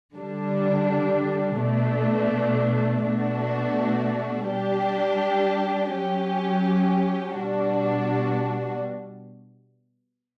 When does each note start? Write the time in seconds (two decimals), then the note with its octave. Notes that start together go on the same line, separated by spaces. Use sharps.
0.14 D3 G3 D4
1.59 B2 A3 D4
3.03 B2 A3 D4 F#4
4.48 G3 D4 G4
5.92 F#3 C#4 G4
7.37 B2 G3 D4 F#4